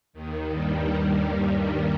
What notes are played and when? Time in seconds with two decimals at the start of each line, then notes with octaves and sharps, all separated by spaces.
0.13 D#2 D#3
0.50 G2 G3